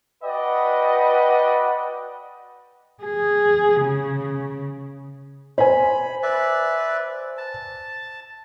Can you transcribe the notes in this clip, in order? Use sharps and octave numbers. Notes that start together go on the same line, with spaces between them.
F#4 B4 D5 D#5 F#5 G5
G#4
C#3
C5 G#5 B5
B4 D5 E5
A5